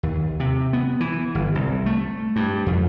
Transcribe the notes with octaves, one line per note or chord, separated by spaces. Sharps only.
D#2
C3
B3
E3
G1
C2
A3
G2
F2